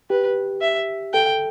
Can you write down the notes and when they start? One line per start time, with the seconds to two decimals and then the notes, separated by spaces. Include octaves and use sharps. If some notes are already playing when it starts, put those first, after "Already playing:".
0.10 G4 B4
0.62 E5
1.13 A4 G5